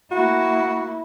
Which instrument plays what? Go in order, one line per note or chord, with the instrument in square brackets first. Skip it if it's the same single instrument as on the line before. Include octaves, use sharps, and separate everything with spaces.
[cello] A#3 E4 [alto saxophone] F#4